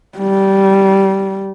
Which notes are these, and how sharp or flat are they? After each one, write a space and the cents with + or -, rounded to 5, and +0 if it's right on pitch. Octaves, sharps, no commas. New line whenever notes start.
G3 -15